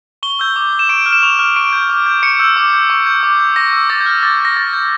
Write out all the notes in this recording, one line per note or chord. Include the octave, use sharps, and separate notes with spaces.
C#6 G7
E6 G6
D6
G6
E7
C#6 D7
F6
E7
C#6 F7
F6
C#6 D7
G6
D6
G6
C#6 C#7
E6 G6
D6
G6
C#6
G6
D6
G6
C#6 A#6
E6 G6
D6 A6
G6
F6
D6 A6
G6 A#6
C#6 A6
G6